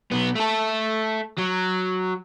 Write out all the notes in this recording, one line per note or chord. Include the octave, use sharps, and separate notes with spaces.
B1 B3
A3 A4
F#3